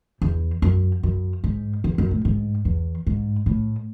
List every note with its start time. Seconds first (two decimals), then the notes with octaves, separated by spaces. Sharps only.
0.22 E2
0.62 F#2
1.03 F#2
1.44 G#2
1.84 E2
1.98 F#2
2.11 A2
2.25 G#2
2.65 E2
3.07 G#2
3.46 A2